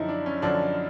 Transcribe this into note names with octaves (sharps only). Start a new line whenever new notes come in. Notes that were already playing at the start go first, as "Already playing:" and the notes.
Already playing: F#2 D3 F3 D#4 E4
D4
C#4
F#2 D3 F3 D4